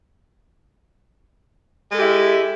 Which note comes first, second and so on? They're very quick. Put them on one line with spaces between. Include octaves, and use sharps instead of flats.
G#3 A4 G4 E4